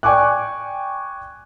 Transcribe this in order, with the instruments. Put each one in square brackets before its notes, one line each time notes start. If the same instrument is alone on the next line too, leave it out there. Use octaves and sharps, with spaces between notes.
[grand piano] D5 G5 G#5 C#6 D6 F#6